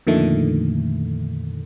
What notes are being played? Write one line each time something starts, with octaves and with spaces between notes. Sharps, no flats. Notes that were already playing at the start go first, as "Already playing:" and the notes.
F2 A#2 D3 D#3 A3